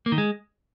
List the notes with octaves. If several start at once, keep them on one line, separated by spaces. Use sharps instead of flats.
A#3
D#3
G#3